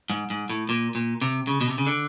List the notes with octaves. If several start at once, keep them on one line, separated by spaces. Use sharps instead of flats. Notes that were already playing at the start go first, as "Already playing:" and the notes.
G#2
G#2
A2
A#2
A#2
C3
C#3
B2
C3
C#3
D3